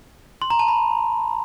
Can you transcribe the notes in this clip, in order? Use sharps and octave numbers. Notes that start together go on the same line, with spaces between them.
C6
A#5
A5
B5